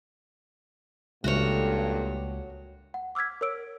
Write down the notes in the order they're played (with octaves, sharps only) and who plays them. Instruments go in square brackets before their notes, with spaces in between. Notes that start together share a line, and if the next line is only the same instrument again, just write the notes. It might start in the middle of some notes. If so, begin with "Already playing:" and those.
[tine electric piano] C#2 [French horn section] G2 A#2 [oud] D#3 A3 [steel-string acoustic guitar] F#4 C#5
[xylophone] F#5
D6 E6 F6 G#6 B6
A#4 C#5 E6 D7